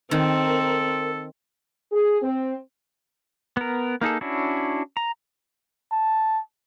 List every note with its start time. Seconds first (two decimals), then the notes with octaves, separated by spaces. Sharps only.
0.11 D#3 C4 A4 A#4
1.92 G#4
2.22 C4
3.57 B3 A#4
4.01 A#3 D#4 G#4 A4
4.21 C#4 D4 E4 F#4
4.97 A#5
5.92 A5